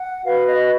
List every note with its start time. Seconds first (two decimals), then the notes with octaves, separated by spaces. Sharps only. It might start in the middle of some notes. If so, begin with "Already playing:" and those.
Already playing: F#5
0.24 F#4 B4 F5
0.47 D#5